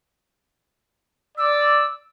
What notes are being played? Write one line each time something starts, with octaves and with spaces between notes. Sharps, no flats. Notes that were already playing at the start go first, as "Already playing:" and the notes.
D5 E6